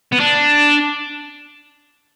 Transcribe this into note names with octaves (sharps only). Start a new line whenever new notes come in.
B3
D4